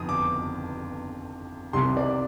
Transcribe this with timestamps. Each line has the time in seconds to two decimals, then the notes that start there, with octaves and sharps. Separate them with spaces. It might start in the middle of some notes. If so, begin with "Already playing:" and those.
Already playing: G1 F2 D#3 D#6
0.09 D6
1.73 C2 C3 D#3 G3 C6
1.97 D5